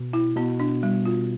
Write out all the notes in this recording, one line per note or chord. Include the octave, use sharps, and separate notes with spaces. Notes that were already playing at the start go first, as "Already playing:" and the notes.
Already playing: B2
E4
B2 B3
D4
G3
F4